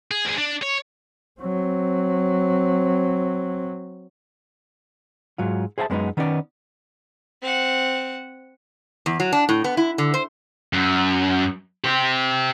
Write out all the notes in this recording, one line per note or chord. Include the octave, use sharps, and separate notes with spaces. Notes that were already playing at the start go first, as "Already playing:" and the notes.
G#4
D2 G#4
D4
C#5
F#3 C4
G#2 F#3 F4
G#4 C5 E5 F#5 A5
F#2 G#3 B3 D4 D#4
D#3 B3 C#4 D#4 B4 D5
C4 F#5
E2
F#3
D4
A2
B3
E4
D3
C5
F#2
G4 C5